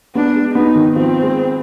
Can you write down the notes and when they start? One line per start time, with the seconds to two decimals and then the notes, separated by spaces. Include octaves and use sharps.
0.15 B3 D4
0.35 G#3
0.55 B3 D#4
0.75 D#3
0.96 F3 C4
1.22 G#3